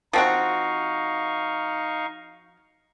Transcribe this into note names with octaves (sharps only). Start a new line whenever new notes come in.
F3 C4 D#4 F#4 F5 C#6